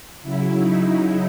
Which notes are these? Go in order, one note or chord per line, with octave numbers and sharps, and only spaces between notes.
C#3 F#3 E4
D#4